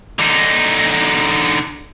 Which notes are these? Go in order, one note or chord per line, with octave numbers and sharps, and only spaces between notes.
D3 D#4